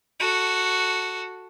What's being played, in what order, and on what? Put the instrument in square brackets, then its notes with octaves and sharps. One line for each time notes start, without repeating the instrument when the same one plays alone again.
[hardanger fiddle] F#4 A4